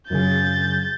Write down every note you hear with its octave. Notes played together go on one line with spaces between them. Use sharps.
F#2 C#3 G#4 G6 A6